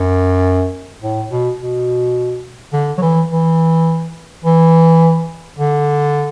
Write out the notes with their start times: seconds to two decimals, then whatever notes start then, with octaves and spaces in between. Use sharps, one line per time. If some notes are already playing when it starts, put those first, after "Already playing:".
Already playing: F#2
1.02 A2
1.31 B2
1.59 B2
2.73 D3
2.98 F#3
3.02 E3
3.30 E3
4.44 E3
5.58 D3